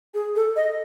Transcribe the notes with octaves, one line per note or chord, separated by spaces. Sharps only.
G#4
A4
D#5